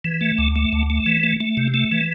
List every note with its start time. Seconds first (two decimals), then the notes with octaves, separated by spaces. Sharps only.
0.04 E3
0.21 A3
0.38 D2
0.56 A3
0.73 D2
0.90 A3
1.06 E3
1.23 A3
1.40 A3
1.57 C3
1.74 A3
1.91 E3